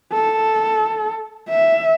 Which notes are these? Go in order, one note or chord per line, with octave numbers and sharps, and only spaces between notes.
A4
E5